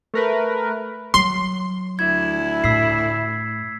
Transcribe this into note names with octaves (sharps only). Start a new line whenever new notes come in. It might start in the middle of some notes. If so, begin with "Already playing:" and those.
A3 A#4 B4
F#3 C6
D2 E4 G#6
A2 E6 B6 C7